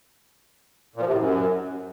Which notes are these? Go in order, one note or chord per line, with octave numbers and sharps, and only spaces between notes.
A#2
F3
C3
A2
F#2